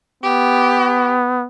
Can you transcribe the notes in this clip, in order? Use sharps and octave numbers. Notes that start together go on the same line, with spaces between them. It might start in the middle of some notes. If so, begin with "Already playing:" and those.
B3 G4